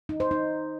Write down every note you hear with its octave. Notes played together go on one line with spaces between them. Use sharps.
D#4
C5
D#4